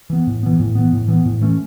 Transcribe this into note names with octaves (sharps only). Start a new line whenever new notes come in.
E3 B3
A2
E3 B3
A2
E3 B3
A2
E3 B3
A2
E3 A3 C#4